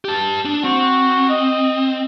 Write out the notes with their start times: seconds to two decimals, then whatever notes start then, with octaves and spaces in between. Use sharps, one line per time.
0.05 G4 A5
0.45 D4
0.64 C4 F#4
1.30 D#5